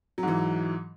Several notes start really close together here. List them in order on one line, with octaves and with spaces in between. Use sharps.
F#3 G#2 E3